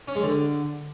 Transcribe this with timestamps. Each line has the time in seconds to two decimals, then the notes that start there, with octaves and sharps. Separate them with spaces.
0.08 C#4
0.15 G#3
0.23 D3